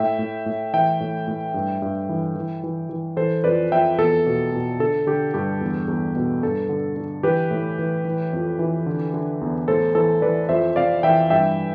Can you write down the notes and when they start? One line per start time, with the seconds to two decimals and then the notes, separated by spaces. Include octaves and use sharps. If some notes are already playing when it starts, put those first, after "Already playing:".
Already playing: A2 E5 G5
0.19 A2
0.46 A2
0.73 E3 E5 G5
1.00 A2
1.28 A2
1.54 G2
1.82 G2
2.09 E3
2.36 E3
2.64 E3
2.89 E3
3.17 E3 A4 C5
3.44 F2 B4 D5
3.72 F2 E5 G5
3.98 E2 A4
4.26 B2
4.52 B2
4.79 D3 A4
5.07 D3 G4
5.34 G2 G4
5.61 E2
5.88 E2
6.16 B2
6.43 G2 A4
6.69 D3
6.97 D3
7.23 E3 G4 B4
7.51 A2
7.79 E3
8.05 E3
8.33 F2
8.59 E3
8.86 D3
9.14 D3
9.41 E2
9.68 A2 A4 C5
9.95 E3 A4 C5
10.22 E3 B4 D5
10.49 F2 C5 E5
10.76 C3 D5 F5
11.03 E3 E5 G5
11.30 G2 E5 G5